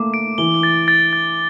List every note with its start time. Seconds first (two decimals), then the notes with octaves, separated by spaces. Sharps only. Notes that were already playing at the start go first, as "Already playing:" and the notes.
Already playing: A3 A#3 D6
0.14 D7
0.38 E3 G7
0.63 A6
0.88 A6
1.13 A6